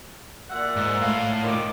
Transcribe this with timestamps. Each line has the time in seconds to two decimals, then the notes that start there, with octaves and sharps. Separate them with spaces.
0.50 A#2 D5 E5 F#5
0.76 G#2
1.01 A2 F5
1.42 A#2 D#3 D6